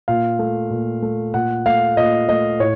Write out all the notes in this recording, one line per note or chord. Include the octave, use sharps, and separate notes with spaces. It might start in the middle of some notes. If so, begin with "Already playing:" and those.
A#2 F5
A3
A#2
A3
A#2 F#5
A3 F5
A#2 D#5
A3 D#5
A2 C#5